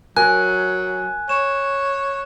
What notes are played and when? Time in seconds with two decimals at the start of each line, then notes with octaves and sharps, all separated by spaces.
0.17 F#3 A#4 G#5 F#6
1.29 C#5 E7